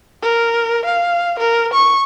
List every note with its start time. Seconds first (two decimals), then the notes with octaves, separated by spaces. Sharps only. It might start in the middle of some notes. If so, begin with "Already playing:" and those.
0.22 A#4
0.86 F5
1.39 A#4
1.74 C#6